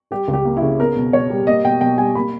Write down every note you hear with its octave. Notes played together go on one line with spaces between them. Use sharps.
G3 G4
C#2
G4
A#3
E4
C#3
B3 A#4
B2
B2 C#5
G3
A#3 D#5
B2 G5
B2 G5
G3 G#5
A#3 B5